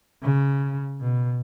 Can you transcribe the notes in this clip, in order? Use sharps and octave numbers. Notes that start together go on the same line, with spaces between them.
C#3
B2